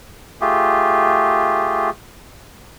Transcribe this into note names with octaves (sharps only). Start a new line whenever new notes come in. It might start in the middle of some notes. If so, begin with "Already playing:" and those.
A3 F4 G4 G#4